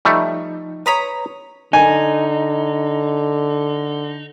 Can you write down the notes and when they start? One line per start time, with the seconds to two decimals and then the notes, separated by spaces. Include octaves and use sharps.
0.05 F3 G3 A3 D#4
0.86 B4 C#5 A#5 B5 D#6
1.73 D3 D#4 G#5